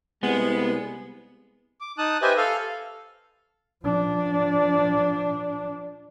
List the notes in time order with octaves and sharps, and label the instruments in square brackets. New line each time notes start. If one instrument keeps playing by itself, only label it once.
[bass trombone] C2 [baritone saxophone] G#3 [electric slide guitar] B3
[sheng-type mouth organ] D6
D#4 A5 D#6 F#6
G4 B4 C5 D#5 E5 G#5
A4 F5
[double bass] F3 D4